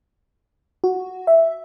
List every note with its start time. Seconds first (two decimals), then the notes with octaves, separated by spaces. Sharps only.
0.84 F#4
1.27 E5